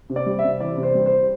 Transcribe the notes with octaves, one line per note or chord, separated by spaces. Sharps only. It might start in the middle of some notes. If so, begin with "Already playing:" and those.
C3
D5
G3
E5
C3
E3 D5
C3
C5
G3
C5